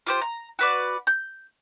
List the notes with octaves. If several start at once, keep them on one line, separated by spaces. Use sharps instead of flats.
F4 G4 C5
A#5
F#4 B4 D5
G6